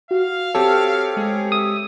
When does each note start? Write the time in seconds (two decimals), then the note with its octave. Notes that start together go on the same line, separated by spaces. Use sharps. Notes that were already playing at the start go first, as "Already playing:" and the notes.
0.11 F#4 F5
0.55 C4 G4 A4 C#5
1.17 G#3 G#4
1.52 E5 D#6